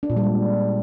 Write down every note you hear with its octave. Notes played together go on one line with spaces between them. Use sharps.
D4
A#2
G3
G#3